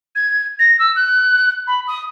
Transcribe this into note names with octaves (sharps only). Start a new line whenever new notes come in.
G#6
A#6
E6
F#6
B5
D#6